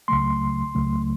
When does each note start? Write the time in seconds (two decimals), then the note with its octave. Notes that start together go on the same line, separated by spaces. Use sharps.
0.08 C#2 C#3 F#3 A3 C6
0.75 C#2 C#3 F#3 A3